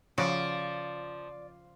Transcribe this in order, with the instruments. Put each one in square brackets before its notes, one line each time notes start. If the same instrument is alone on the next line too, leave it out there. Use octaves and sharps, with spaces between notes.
[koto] C#3 F#4 [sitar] F3 [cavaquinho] D5